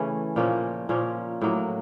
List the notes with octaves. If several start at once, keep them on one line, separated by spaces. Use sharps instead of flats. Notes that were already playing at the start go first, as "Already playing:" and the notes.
Already playing: C#3 E3 A3 C#4
A#2 F3 A#3 C#4
A#2 F3 A#3 C#4
A2 F#3 A#3